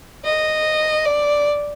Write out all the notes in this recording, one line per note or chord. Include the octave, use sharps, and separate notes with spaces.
D#5
D5